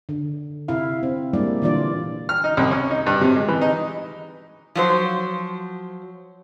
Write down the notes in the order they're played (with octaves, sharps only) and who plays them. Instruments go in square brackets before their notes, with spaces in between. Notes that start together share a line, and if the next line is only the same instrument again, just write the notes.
[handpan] D3
C3 E4 F5
C4
G3 G#3 A#3 D4 E4 D5
A#2 D3 E3 F4 D5
[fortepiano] F6
D#4
C2
C#4
D#4
G2
C3
G#3
E3
D#4
[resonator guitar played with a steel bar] F3 F#3 C5